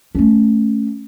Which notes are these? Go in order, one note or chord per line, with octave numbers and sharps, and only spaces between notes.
A3 C#4